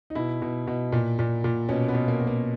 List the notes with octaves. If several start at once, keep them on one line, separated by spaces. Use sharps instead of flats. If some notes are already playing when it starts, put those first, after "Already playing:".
D#4
B2 E4
B2
B2
A#2
A#2
A#2
B2 C#4
B3
B2
A#3
B2
A#3